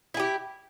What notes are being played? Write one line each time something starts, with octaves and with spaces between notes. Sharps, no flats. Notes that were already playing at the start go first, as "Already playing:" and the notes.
E4 G4 G#4